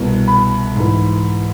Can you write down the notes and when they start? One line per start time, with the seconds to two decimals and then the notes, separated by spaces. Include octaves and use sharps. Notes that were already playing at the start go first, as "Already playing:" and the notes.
Already playing: C2 B2
0.27 B5
0.75 G#2 E3